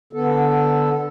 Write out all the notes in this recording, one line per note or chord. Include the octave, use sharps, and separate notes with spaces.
D3 B3 A4